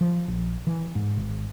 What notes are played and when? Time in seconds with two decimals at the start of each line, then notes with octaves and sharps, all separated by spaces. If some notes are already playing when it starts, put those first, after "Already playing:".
0.01 F3
0.28 A#1
0.67 E3
0.95 G#2
1.17 G#1